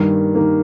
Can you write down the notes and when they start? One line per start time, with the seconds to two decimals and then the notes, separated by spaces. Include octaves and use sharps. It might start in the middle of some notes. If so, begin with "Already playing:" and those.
Already playing: G2 D#3 A#3
0.35 D#3 A#3